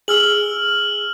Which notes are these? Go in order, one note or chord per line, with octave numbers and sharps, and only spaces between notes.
G#4 E6 F6 F#7